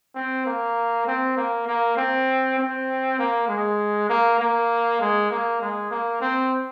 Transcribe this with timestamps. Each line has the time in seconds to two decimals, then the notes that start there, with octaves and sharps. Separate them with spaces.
0.15 C4
0.46 A#3
1.07 C4
1.37 A#3
1.67 A#3
1.97 C4
2.58 C4
3.19 A#3
3.48 G#3
4.09 A#3
4.39 A#3
5.01 G#3
5.30 A#3
5.61 G#3
5.91 A#3
6.21 C4